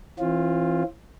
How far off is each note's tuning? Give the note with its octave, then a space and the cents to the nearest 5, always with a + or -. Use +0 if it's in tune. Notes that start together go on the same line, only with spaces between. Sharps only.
E3 +10 C4 +45 F4 +0